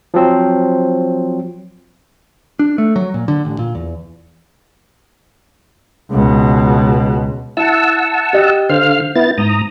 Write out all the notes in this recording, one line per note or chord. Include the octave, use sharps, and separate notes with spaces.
F3 F#3 C4
D4
A3
F#3
A#2
D3
A1
A#2
E2
C#2 B2
E4 F#5 A5 E6
G4 D#5
D3 C5 F5 F6
B3 E4 A6
G#2 A#5 D#6